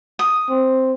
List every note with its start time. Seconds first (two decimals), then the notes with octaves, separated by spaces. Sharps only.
0.19 D#6
0.50 C4